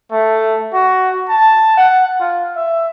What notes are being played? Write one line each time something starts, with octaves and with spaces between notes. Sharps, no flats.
A3
F#4
A5
F#5
F4
E5